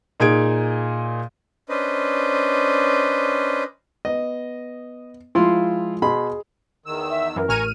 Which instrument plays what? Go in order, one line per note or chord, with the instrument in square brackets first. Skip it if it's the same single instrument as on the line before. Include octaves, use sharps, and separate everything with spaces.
[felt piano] A#2 D#4 G#4 G#6 D7
[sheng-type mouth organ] C#4 D4 B4 C5 D#5
[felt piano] B3 [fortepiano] D#5
[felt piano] F3 G#3 [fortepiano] E4 F4 C6
[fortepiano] B2 B5 C6 [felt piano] G#4
[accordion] E2 D#3 E6
[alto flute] E5
[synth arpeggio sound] F#2 E3 [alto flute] A#4
[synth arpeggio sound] A1 F6 D#7 [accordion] G#5 A#5 C#6